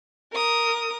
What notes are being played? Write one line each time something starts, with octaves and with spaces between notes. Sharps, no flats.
A#4 D#6